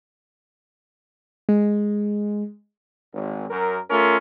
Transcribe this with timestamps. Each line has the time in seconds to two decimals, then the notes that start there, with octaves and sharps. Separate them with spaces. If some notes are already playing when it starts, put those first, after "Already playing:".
1.49 G#3
3.13 G#1
3.50 F#2 A#4
3.89 A3 C#4 F4 A#4